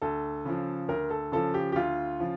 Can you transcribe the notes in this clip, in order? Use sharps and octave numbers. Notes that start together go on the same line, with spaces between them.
D2 A4
C#3 F3
D2 A#4
A4
C#3 F3 A4
G4
G4
D2 F4
C#3 F3